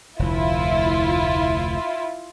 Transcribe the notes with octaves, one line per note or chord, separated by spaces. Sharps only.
F1 D2 E4 F4